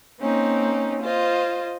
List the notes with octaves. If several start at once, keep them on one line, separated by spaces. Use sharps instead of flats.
A#3 C4 C#4 D#4
F4 C5 D#5